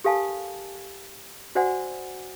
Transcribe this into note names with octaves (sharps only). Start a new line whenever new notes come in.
G4 A4 A#4 F5 G#5 A5
F#4 C5 D5 F#5 G#5